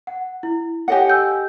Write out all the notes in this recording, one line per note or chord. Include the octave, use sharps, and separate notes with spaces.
F#5
E4
G4 A4 C#5 D#5 F#5 G#5
G#5 E6 G6